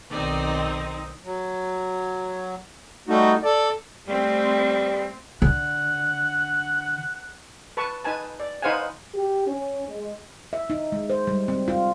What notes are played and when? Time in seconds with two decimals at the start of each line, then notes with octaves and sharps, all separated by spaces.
0.11 B1 D#3 C4 D#4 D5
1.24 F#3
3.08 G3 A3 D#4 F#4
3.43 A4 D5
4.08 G3 A3 C4
5.42 D3 F#5
7.77 B4 A5 C#6
8.04 D#4 B4 G#5 A5
8.40 D5
8.62 D#4 B4 C5 F5 F#5 G#5
9.14 G4
9.47 C#4
9.88 G#3
10.53 E5
10.70 D#4
10.92 G#3
11.10 C5
11.27 G3
11.48 C4
11.68 F4